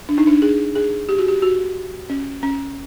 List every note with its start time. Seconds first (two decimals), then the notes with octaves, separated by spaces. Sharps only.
0.09 D4
0.18 D#4
0.27 D4
0.42 G#4
0.76 G#4
1.09 G4
1.19 F#4
1.28 G4
1.42 F#4
2.10 C#4
2.43 C#4